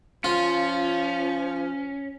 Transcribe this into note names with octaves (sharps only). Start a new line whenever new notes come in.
F3 C#4 F4